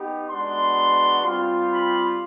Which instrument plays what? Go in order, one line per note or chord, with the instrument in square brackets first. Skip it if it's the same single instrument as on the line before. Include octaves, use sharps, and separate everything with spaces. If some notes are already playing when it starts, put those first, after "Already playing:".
Already playing: [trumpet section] B3 D#4 G4
G#3 B3 D4 F#4 C6
G3 C4 F4
B5